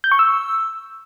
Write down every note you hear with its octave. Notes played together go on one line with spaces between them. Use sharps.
G6
C#6
E6